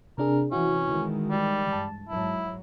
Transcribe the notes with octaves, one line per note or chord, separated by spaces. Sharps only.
C3 D4 G#4 A#4
C3 E3 C#4 E4 F#4
D#3 E3 G#3
G3
G2 A5
G#2 F#3 E4